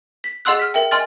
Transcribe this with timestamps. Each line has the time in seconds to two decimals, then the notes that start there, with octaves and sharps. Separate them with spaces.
0.24 B6
0.45 G#4 D#5 F#5 C6 E6 F#6
0.59 F6 B6
0.74 A#4 E5 G5
0.91 D#5 G#5 C6 F6 A6